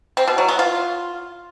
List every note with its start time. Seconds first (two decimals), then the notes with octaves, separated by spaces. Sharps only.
0.17 C4
0.28 B2
0.38 F#3
0.48 B3
0.59 F4